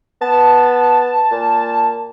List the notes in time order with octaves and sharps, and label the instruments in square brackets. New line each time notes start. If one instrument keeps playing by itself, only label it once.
[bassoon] B3 [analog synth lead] A5
[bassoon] A#2